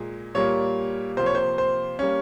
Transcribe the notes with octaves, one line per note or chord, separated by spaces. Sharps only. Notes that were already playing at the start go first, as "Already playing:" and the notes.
Already playing: A#2 G#3
A#2 G3 A#3 C#5
C3 F3 A#3 C5
C#5
C5
C5
G3 A#3 C#4